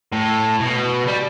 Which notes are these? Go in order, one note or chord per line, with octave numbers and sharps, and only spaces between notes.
A2
B2
G3